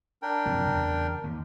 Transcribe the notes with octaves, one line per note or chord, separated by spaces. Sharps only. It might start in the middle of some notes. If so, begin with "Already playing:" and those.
D4 A#4 G5
F#2 C3 F3
E2 C#3
D#2